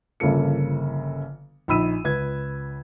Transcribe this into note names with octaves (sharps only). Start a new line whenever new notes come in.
G1 C#3 F3 A#3 A4 C#7
A#1 D#4 B5 E6 D#7
C#2 B4 G#6